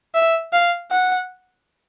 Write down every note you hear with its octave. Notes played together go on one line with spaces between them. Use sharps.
E5
F5
F#5